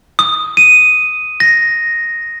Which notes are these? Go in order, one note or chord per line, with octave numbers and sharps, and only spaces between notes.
D#6
D#7
A#6